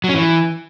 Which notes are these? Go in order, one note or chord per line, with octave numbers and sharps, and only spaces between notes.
F#3
C#4
E3